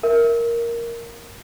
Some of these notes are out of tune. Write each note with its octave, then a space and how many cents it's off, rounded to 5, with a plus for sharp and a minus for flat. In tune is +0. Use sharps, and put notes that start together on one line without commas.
A#4 +0 E5 +0